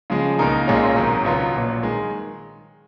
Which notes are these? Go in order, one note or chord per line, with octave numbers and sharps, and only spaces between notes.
C#3 F3 G#3
C#2 B2 A#3 D#4 A#4
B1 A#2 G#3 C#4 F4
G#1 G#2 D#3 F#3
C#2 B2 F#3 B3 F4
A#1 A#2 F#3
D#3 G#3